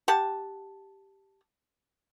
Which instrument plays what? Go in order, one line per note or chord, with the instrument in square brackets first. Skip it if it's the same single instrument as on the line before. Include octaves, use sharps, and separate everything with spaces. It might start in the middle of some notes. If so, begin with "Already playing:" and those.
[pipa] G4 F#5 A5